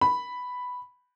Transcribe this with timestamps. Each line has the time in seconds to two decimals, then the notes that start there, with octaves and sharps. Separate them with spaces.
0.01 B5